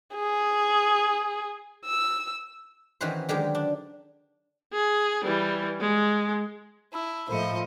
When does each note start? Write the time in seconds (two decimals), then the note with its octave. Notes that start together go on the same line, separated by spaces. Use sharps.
0.15 G#4
1.85 E6
3.01 D#3 E3 C#4 F#4 B4 C5
3.29 D3 D#3 F#3 G#3 G4
3.55 D4
4.73 G#4
5.24 E3 G3
5.80 G#3
6.93 E4 A5 B5 E6
7.29 A2 F3 A3 A#4 C5 D#5 B5 C#7